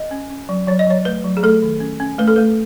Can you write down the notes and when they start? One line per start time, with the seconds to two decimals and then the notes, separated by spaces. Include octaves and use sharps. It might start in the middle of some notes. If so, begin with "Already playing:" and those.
Already playing: D#5
0.11 C#4
0.30 C#4
0.49 F#3
0.67 F#3 C#5
0.79 D#5
0.87 F#3 C#5
1.05 A3 B4
1.24 F#3
1.37 G#4
1.43 A3 A4
1.62 D#3
1.80 C#4
2.00 C#4
2.18 A3 B4
2.28 A4
2.36 A3 B4